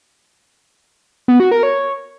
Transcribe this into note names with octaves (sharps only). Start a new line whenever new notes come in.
B3
F#4
A#4
C#5